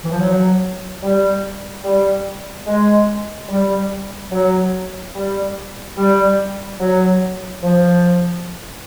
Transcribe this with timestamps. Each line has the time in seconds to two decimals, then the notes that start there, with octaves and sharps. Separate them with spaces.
0.04 E3
0.11 F3
0.19 F#3
1.02 G3
1.84 G3
2.67 G#3
3.49 G3
4.32 F#3
5.14 G3
5.97 G3
6.80 F#3
7.63 F3